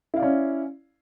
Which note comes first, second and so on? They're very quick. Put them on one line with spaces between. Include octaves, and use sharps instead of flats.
E4 F5 D5 C#4